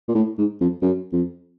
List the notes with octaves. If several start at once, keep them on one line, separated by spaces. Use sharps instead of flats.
A#2
A2
G#2
F2
F#2
F2